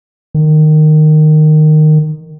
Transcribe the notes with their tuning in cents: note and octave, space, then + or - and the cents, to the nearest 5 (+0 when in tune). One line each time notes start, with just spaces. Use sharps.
D#3 -15